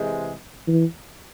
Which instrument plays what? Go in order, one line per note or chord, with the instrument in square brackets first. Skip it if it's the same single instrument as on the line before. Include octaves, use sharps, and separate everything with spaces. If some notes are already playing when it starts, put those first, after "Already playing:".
Already playing: [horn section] C3 E3 G#3
[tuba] E3